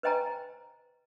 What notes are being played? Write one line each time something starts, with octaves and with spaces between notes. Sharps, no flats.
B4 C5 D#5 G5 G#5 A#5